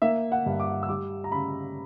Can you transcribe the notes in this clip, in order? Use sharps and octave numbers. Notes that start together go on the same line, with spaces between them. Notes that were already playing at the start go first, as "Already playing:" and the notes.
A#3 E5
F#5
G2
D6
E6
G3 D6
A#5
C#3 B5